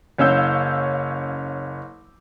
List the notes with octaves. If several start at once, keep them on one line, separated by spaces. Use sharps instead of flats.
F#1 C#4 F5 E6 G6